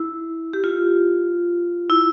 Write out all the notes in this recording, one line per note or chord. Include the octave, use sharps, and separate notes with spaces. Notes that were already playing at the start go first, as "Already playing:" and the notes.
Already playing: E4
G4
F4
E4